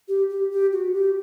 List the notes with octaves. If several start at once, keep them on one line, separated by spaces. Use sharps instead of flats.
G4
G4
G4
F#4
G4